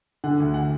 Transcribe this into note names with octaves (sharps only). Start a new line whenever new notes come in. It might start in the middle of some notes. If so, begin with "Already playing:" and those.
D3 F#5
D2
F#5